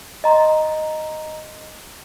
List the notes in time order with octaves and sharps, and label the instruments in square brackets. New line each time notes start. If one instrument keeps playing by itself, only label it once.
[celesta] D#5 A#5 C6